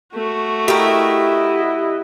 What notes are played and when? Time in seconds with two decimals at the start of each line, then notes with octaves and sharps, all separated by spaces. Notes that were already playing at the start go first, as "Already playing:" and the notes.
0.14 A3 F#4
0.68 E4 G4 A#4 D#5 F#5